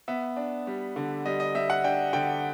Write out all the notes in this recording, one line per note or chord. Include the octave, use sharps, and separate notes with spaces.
B3 E5
D4
G3
D3
G3 D#5
D#5
G3 E5
F#5
D4 G5
D3 G5